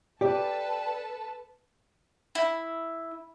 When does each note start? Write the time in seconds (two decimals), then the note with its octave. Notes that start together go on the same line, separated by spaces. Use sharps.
0.21 G4 A4 B4 D5 A5
2.35 E4